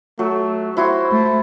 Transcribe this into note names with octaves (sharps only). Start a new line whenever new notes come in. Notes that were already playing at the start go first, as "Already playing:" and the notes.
F#3 A3
E4 F#4 C5 C6
A3